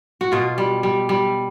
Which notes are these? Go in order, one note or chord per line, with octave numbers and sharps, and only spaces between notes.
F#4
B2 F4
G3
G3
G3